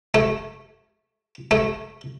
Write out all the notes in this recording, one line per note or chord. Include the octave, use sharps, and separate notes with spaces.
A3
A3